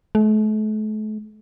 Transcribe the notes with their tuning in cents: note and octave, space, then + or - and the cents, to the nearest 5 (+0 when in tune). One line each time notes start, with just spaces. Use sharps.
A3 -40